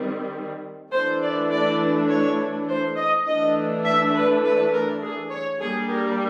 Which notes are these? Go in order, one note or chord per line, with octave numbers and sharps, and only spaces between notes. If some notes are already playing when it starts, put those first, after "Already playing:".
Already playing: D#3 G3 C4
E3 A3 D4 C5
D5
D5
C#5
C5
D#5
E3 A3 D4 D#5
E5
B4
B4
A#4
G#4
C#5
G3 A#3 D4 G#4
A#4